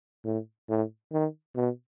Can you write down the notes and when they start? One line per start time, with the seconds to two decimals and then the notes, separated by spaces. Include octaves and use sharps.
0.25 A2
0.70 A2
1.13 D#3
1.56 B2